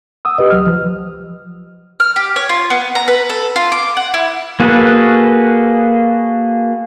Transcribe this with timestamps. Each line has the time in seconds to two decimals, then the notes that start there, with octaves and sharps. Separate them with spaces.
0.25 F#5 D#6 E6
0.38 G4 B4 D#5
0.50 C#2 F#3 F6
0.67 F3
2.00 F6
2.16 G4
2.36 C#5
2.49 F4
2.70 B3
2.95 A#5
3.08 B4
3.29 A4
3.56 F4
3.72 D6
3.97 F#5
4.14 E4
4.60 A#3 F#4 G#4 A4 B4